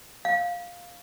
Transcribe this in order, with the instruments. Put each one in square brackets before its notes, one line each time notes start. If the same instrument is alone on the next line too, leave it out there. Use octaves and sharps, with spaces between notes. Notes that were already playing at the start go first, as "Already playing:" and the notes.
[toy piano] F5